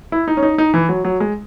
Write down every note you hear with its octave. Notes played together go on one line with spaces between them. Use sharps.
E4
D#4
C#4
D#4
D#4
E3
F#3
F#3
G#3